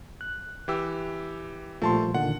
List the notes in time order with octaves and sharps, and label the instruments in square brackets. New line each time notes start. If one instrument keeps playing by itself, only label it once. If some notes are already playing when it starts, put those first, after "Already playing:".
[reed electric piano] F#6
[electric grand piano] E3 G4 E6
[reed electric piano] A#2 F3 G3 [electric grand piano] A3 A5 C6
[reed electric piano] A#2 D3 D#3 [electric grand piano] F#5